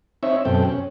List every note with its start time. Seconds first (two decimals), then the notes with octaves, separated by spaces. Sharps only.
0.23 C4 D#4 C#5 E5
0.45 F#2 B2 C4 A4 G5
0.65 C#4